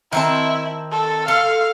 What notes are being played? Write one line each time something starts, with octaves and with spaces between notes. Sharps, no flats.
D#3 C4 E4 A5
A4
A4 F5